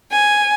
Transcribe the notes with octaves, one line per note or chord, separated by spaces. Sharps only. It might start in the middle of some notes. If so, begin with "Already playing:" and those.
G#5